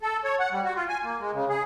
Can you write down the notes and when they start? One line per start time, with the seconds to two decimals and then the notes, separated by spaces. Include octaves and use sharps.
0.01 A4
0.24 C#5
0.40 F#5
0.52 G3
0.64 F#4
0.76 F4
0.89 G#5
1.04 A#3
1.20 G#3
1.33 C#3
1.49 G#4